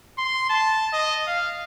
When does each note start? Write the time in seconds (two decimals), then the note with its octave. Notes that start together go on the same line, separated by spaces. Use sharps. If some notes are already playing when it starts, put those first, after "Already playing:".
0.18 C6
0.49 A5
0.93 D#5
1.27 F5